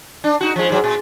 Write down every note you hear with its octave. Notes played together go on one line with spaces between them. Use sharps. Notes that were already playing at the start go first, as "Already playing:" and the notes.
D4
D#4 F#4
F3 G#3
G#2 F#3
A#2